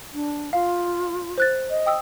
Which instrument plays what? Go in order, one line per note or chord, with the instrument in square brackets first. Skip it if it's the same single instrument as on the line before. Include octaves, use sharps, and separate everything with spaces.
[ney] D4
[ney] F4 [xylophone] F5
[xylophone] C5 F#6 A6
[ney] D#5
[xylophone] G5 D#6 E6